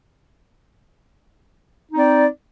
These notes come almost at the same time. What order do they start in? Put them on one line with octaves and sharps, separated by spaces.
D#4 C4 D5